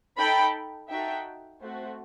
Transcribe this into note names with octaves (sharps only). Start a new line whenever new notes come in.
D#4 A4 G5 B5
D#4 F#4 A4 E5 G5
A3 C4 F#4 C5